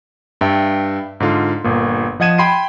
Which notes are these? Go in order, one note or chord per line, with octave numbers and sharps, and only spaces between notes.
G2 E5 G5
G#2 D3 F4
G1 A#2
F3 D#5 F#5 G#6 D#7 E7
G5 B5 C6 G#6 C7 D#7